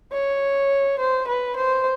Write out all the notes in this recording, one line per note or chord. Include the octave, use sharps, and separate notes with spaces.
C#5
C5
B4
C5